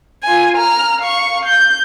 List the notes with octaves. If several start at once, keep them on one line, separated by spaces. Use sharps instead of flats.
F4 G#5
A#5 F6
F5 C#6
G6